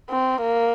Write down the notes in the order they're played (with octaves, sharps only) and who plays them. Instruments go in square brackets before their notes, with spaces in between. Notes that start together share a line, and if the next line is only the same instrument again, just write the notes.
[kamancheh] C4
A#3